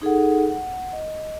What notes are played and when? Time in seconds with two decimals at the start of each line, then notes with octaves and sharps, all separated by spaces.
0.02 D#4 G#4 A4 F#5
0.50 F#5
0.93 D#5